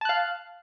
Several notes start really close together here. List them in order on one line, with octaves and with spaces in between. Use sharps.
A5 F#6 F5